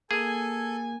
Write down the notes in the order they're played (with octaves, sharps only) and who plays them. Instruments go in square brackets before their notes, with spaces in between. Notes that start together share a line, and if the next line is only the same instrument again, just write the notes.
[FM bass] A#3 [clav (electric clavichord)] G#4 [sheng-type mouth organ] A4 [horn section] G#5